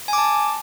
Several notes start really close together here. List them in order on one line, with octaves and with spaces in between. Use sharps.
G#5 D6 A5